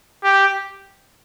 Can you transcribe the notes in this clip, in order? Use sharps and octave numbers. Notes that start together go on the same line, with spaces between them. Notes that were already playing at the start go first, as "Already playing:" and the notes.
G4